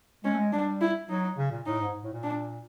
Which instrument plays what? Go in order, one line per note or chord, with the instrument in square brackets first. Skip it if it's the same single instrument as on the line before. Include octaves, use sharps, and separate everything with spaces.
[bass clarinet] G#3 [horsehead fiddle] C#4
[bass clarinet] A3
G#3
[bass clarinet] G3 [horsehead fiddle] D4
[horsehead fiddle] E4
[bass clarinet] F#3 [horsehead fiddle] D#4
[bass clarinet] C#3
A#2
[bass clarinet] A2 [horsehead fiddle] D#4
[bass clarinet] G#2
A2
A#2
[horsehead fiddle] D4